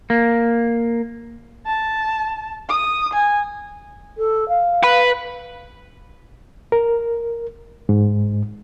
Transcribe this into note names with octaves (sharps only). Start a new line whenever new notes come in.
A#3
A5
D#6
G#5
A4
F5
B4
A#4
G#2